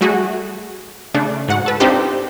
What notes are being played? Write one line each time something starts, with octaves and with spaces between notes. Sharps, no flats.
G3 A3 F#4 G#4
C#3 A3 D4
G#2 F#4 F#5
A4 B4
C4 D4 D#4 F4 G4 C5